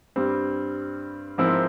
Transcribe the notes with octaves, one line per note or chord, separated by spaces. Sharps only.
G2 G3 C4
G#2 F3 C4 E4 A#4